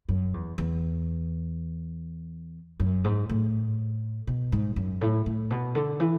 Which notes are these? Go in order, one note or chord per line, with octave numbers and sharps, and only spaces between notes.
F#2
E2
E2
F#2
G#2
A2
B2
G#2
F#2
A2
A2
B2
D3
E3